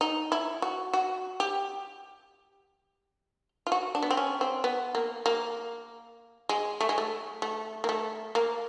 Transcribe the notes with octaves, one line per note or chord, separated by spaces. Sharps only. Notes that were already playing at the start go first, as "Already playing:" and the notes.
D#4
E4
F#4
F#4
G4
F4
F#4
D4
B3
C4
C#4
C4
B3
A#3
A#3
G#3
A3
G#3
A3
A3
A#3
A3
A#3